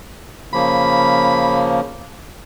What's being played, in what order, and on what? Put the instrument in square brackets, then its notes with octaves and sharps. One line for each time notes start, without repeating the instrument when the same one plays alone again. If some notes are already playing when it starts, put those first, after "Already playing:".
[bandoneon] C#3 F3 A#3 [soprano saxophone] B5